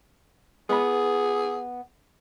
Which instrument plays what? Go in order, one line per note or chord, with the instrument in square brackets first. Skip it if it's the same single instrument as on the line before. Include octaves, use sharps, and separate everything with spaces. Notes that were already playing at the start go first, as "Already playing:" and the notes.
[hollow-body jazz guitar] B3 B5 [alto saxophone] G#4